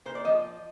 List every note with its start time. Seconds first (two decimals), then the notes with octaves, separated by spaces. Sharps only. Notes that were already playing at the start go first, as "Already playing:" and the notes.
0.06 A#2 C5
0.15 D5
0.25 F3 D#5